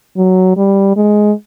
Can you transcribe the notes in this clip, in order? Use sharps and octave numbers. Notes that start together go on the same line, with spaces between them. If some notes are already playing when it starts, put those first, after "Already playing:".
F#3
G3
G#3